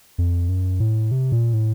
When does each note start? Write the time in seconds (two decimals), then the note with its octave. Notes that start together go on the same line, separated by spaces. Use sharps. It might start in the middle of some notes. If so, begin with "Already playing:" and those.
0.18 F2
0.49 F#2
0.80 A2
1.11 C3
1.32 A#2
1.53 A2